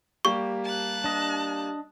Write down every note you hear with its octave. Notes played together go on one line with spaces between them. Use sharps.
G3 A#3 G4 C#6
A5 F#6
D4 D#5